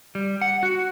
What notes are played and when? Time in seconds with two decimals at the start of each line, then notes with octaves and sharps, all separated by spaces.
0.15 G3
0.42 F#5
0.63 F#4